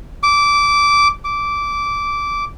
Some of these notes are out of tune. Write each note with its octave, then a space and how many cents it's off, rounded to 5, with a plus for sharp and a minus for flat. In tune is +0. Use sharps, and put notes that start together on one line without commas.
D6 -15
D6 -15